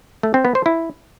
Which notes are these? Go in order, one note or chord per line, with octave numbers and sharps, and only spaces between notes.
A3
C4
B3
C5
E4